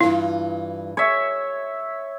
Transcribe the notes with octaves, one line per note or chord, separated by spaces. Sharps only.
G2 E3 E4 F4
G#4 C#5 E5